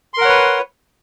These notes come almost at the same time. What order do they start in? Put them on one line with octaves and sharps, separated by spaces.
C6 A#4 F#5 C#5 B4